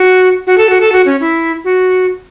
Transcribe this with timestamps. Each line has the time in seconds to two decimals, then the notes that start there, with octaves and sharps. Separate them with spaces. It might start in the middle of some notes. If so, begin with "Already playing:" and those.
Already playing: F#4
0.47 F#4
0.58 A4
0.69 F#4
0.81 A4
0.92 F#4
1.06 C#4
1.21 E4
1.64 F#4